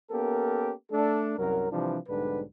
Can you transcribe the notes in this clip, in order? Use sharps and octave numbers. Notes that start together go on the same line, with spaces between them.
A#3 B3 C#4 G4 A4 A#4
A3 D4 A4
C2 F#2 F#3 A#4
C3 E3 F3 G3 D4
B1 G#2 D3 G3 D4 B4